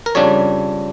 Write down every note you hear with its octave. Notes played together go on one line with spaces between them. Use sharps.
A#4
F2 C#3 G3 D4 C#5